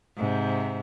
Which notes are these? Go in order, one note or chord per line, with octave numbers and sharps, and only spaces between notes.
G#2 C3